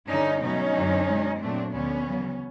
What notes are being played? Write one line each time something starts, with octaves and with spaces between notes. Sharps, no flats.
G2 D3 G3 C#4 D#4
B2 F#3 A3 C#4 D#4
F#2 D3 F#3
B2 G#3
A#2 F#3 A3 C4 D4
D2 D3 F3 G#3 B3 C#4
E2 C#3 F#3